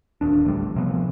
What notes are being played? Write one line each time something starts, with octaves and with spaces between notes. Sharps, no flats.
D1 D#2 D4
A1 D2 G3
C3 F3 B3